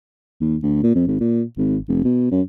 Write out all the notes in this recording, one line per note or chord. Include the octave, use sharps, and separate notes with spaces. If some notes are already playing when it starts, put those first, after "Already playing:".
D#2
D2
A#2
F2
G#1
A#2
G#1
F1
B2
F#2